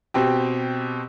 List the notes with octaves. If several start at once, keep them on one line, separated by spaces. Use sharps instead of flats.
B2 C4 G4